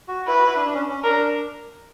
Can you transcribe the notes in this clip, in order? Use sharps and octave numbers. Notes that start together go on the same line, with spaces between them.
F#4
E4 B4
F#4
E4
D4
D4
C#4
C#4
D4 A#4